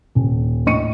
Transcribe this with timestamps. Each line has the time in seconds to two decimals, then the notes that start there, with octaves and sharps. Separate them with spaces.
0.15 D#1
0.67 A2 D#5 C#6 C#7 D#7